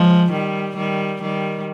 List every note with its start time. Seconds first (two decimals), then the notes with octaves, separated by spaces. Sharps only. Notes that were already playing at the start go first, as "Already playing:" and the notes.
Already playing: F3 G#3
0.32 D#3 G3
0.76 D#3 G3
1.22 D#3 G3